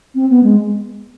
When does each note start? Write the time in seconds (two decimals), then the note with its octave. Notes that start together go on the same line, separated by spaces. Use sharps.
0.15 C4
0.29 B3
0.43 G#3